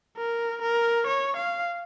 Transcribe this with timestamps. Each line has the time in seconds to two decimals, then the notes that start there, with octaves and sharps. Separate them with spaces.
0.17 A#4
0.62 A#4
1.07 C#5
1.36 F5